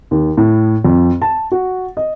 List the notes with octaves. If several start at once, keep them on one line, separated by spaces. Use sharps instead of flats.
D#2
A2
F2
A5
F#4
D#5